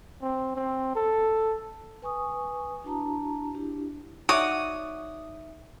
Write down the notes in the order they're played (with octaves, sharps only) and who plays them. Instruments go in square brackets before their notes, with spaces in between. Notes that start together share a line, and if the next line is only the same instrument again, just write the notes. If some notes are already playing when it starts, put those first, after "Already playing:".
[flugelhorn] C4
C4
A4
[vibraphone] B4 G#5 C#6 D#6
D4 E4 F#4 A5 A#5
D4 E4 G4
[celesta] D#4 E5 [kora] F#4 C#5 D5 [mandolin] D#6